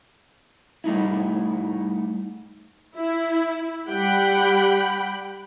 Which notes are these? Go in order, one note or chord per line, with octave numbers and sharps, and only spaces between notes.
G3 A3 D#4 E4
E4
G3 G4 F#5 G5 B5